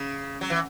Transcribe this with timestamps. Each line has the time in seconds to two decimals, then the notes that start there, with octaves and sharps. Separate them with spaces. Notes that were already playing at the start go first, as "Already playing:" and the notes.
Already playing: C#3
0.41 F#3
0.50 E3